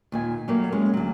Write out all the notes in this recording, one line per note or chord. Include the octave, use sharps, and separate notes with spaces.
D#2 A#2 G#5
F#3 G3 A3 A#3 F5
G#3 C#4
D2 F#3